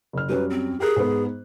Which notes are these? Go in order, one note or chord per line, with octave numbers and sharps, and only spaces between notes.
F#1 F6
F#2 F#3 G3 B4
C4
G4 G#4 A#4 F#6
G#2 B3